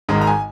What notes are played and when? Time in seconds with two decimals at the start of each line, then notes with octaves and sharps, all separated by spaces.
0.09 G#1 G#2 D#3 G#3 A#5
0.21 A#5
0.27 G#5